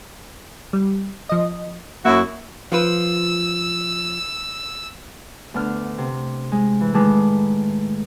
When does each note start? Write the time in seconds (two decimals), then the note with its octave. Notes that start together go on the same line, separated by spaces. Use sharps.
0.73 G3
1.29 F3 D#5
2.05 F#2 A#3 E4 F#4
2.72 F3 F4 B4 E6
5.54 D2 B3 D4 F6
5.98 C3
6.52 G#3
6.81 E3
6.94 A2 D#3 G#3 B4 A5 D6